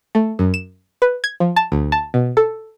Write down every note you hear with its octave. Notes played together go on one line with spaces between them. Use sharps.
A3
F#2
E7
B4
G#6
F3
A5
D2
A5
B2
A4